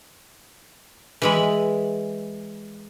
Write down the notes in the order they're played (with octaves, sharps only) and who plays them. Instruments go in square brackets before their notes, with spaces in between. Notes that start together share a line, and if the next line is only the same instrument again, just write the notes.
[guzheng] E3 G#3 B5